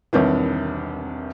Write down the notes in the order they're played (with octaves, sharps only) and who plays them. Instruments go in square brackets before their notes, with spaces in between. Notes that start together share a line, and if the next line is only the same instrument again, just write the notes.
[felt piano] E1 C2 C3 D#3 E3